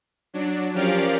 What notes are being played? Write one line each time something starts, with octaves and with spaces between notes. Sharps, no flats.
F#3 D4
F3 C#4 G4 A#4 D5 F5